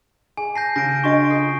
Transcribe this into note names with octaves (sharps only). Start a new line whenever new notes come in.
G#4 G#5
A5 G6 A#6 C7
C#3 A#6 D7
D4 F#4 D#5 C#6 D7
F4 A4 C7